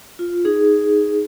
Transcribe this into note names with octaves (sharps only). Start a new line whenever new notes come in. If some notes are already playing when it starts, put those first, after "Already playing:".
F4
D#4 G#4